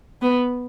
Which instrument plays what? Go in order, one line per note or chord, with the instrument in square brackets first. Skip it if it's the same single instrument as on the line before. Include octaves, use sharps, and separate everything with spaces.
[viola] B3